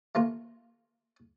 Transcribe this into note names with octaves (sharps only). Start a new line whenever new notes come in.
A3 A#3 F4